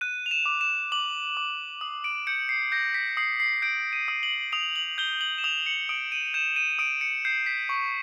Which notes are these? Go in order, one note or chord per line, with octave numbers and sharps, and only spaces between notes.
F#6 D#7
F7
E7
D6
E7
D6 F#7
D6
D#6
D7
G6 C#7
C7
G6 A#6
B6
D#6 C7
C7
G6 D7
D#7
D#6
F#7
D#6 F7
F#7
G6 G7
F#7
E7
D#6 F7
C#7
D#6 D7
D#7
G6 E7
D#7
D#6 D7
C#7
G6 C7
B6
C#6